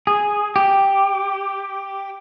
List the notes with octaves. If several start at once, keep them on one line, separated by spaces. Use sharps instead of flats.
G#4
G4